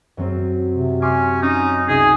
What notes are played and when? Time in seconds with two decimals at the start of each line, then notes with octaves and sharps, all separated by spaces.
0.17 F#2 F#3 C4
0.71 C3
1.02 C#4 G#5 C6 D6
1.42 C#4 D#4
1.88 C2 D#4 G#4 B6